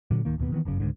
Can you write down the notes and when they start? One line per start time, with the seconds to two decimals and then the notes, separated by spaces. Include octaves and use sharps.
0.11 A#2 D3 F#3
0.25 D1 D#3 A#3
0.38 D1 D#2 B2 B3
0.52 D#3 E3 B3
0.65 G1 F#2 C#3
0.80 C#2 G#2 D3